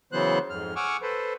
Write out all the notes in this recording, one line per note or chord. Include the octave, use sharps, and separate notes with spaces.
C#3 E3 F#3 B3 C5 F#6
F2 G#2 F6
F#5 G#5 C#6 D6 E6 F6
A4 B4 C5